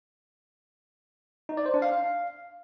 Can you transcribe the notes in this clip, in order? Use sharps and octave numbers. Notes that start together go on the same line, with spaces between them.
D#4
D5
C5
D4
F5